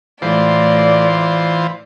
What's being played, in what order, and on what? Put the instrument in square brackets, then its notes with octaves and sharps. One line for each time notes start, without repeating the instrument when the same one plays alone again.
[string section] A2 [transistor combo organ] E3 F4 C5 [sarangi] D5